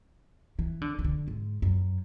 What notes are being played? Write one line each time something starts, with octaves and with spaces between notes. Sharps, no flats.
E3
D3
E3
D3
G#2
F#2